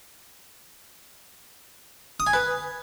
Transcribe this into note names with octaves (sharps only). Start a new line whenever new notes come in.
D#6
G#5
B4